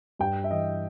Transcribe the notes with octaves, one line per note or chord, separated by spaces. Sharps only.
G2 G5
E5
E3 D#5